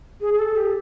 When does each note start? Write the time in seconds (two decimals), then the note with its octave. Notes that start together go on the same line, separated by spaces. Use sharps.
0.21 G#4
0.33 G#4
0.39 A4
0.56 G4